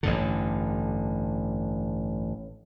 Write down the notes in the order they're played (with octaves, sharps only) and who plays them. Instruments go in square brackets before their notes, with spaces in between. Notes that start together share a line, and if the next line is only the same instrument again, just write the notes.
[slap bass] A1 G2 D3